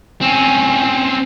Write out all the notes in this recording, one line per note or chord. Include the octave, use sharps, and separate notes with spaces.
C4 C#4